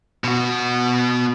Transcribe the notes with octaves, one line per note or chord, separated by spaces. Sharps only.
B2 F#4